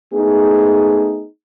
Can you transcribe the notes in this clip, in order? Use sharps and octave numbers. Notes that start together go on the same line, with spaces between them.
A3 B3 D#4 G#4